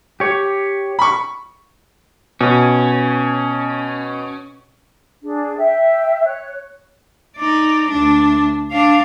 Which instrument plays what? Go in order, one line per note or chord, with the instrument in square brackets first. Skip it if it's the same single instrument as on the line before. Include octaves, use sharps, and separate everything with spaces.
[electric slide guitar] G4 C#5
[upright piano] B5 C#6
[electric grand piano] B2 [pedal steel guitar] C#4
[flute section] D4 G#4
E5 G5
C#5 F#6
[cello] D#4 D5
D2 D4
D4 F5